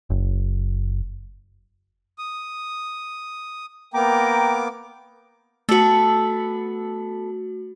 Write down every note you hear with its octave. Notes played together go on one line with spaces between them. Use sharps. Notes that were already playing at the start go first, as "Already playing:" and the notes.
F#1
D#6
A#3 B3 G5 A#5 D6
A3 B3 F#4 A4